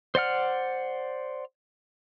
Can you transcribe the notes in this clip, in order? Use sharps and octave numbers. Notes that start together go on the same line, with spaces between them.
C5 D5 F#5 F6